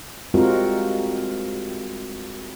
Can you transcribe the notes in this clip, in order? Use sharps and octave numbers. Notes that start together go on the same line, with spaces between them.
G3 G#3 C4 F4 F#4 A#4